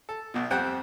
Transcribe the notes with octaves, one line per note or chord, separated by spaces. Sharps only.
A4
B1 B2
F2 G3 C4 F#5 G5 F#6